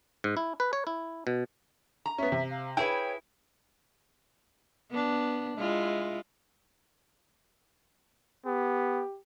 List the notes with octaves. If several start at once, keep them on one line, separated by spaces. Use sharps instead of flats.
G#2
E4
B4
C#5
E4
B2
A#5
B3 C#4 E5
C3
F5
E4 G#4 B4 C#5 G5
B3 D4
G#3 E4 F4
B3 G4